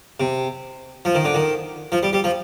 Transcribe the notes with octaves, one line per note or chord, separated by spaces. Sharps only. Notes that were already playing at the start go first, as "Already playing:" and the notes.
C3
F3
D#3
D3
D#3
F3
G3
G3
F3